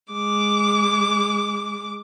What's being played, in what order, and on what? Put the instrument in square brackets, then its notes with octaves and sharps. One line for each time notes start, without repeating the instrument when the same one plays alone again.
[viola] G#3 D6